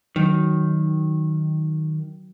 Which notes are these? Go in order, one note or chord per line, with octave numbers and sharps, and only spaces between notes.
D#3 F#3